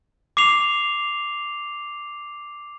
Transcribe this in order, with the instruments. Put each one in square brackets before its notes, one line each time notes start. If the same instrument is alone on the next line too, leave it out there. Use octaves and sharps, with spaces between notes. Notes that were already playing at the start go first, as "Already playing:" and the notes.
[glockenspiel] D6 C7 F7